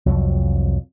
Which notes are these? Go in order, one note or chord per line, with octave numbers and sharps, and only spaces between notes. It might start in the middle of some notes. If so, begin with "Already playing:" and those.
C2 F2 F#3